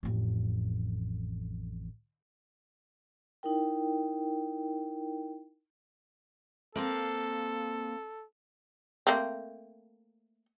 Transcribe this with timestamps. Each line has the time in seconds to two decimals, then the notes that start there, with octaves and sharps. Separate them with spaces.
0.03 A1 F2
3.43 D#4 E4 A#4 G5
6.76 A#3 C4 A4 F5
9.07 A3 A#3 C4